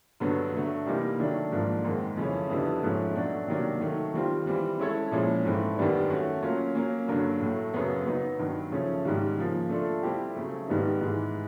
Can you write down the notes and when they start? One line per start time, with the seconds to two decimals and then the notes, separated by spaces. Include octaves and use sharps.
0.20 G2 D3 F#3 B3
0.53 D3 F#3 A3
0.86 C3 E3 G3 A#3 D#4
1.19 D#3 F#3 A3 D4
1.52 G#2 F3 A#3 D4
1.84 F#2 D#3 G#3 C4
2.17 F2 C#3 E3 A3 C#4
2.50 F2 D3 G3 B3 E4
2.83 G#2 F3 A3 C#4
3.15 B2 F#3 A3 D4 F#4
3.48 C3 D#3 F#3 A#3 D4
3.81 D#3 F#3 A3
4.14 D#3 G3 C4 F4
4.46 E3 G3 C4
4.79 G#3 C#4 E4 A4 C#5
5.11 A#2 F3 G#3 C#4 E4
5.45 G#2 E3 A3 C4
5.77 F#2 D#3 G3 B3 D4
6.10 A3 C#4 F#4
6.42 F#3 A#3 C#4 F4
6.75 F#3 A#3 C#4
7.08 G2 D3 F#3 A#3
7.40 A2 F#3 A3
7.74 F#2 C#3 F#3 B3
8.06 F#3 B3 D#4
8.39 G2 D#3 F#3
8.72 C#3 F3 A3 C#4
9.05 G#2 D#3 G3
9.38 C#3 F3 A#3
9.69 A3 D4 F4 A4
10.03 G3 C4 E4 G4
10.35 C#3 F#3 A3
10.68 G#2 D#3 G3 B3 D#4
11.01 G#2 E3 G#3